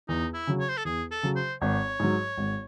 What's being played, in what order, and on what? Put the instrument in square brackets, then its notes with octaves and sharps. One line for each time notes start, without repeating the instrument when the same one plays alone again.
[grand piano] E2 [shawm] D#4
[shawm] E4
[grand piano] C#3 F#3
[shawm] C#5
C5
A4
[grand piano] E2 [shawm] G#4
[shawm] A4
[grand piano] C#3 F#3
[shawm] C5
[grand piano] G#1 [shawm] C#5
[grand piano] G#2 F#3
G#1